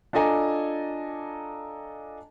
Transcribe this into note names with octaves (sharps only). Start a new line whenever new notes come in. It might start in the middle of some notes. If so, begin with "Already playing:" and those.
D4 F4 A4 D#5 G#5 A#5